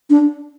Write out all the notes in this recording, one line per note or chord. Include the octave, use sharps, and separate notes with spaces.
D4